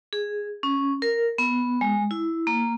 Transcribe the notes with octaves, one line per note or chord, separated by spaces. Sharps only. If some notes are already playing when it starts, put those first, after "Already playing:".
G#4
C#4
A#4
B3
G#3
E4
A#3